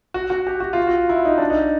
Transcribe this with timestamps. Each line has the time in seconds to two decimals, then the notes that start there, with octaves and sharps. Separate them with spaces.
0.14 F#4
0.30 F#4
0.47 G4
0.60 F#4
0.73 F4
0.87 F#4
1.09 E4
1.25 D#4
1.38 D4
1.50 D#4